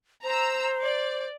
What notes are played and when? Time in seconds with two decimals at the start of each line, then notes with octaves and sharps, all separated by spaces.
0.24 C5 A#5 E6
0.81 D5